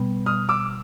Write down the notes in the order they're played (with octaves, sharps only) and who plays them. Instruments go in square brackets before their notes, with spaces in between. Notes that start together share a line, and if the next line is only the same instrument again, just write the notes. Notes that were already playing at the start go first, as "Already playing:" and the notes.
Already playing: [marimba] B2 G3 B3
[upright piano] D#6 F6
D6 E6